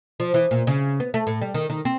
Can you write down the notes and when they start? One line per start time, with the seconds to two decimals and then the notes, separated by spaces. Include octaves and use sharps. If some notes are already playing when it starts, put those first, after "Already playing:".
0.20 F3
0.34 E3
0.51 A#2
0.67 C#3
1.00 B3
1.14 A3
1.27 A2
1.41 G3
1.54 D#3
1.70 D#3
1.85 C4